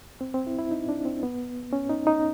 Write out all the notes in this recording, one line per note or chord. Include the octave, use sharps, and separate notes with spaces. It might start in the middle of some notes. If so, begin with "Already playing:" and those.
C4
C4
E4
E4
D#4
D4
C4
B3
C#4
D#4
D#4